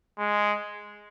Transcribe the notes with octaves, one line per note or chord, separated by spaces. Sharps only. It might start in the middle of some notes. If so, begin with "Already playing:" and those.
G#3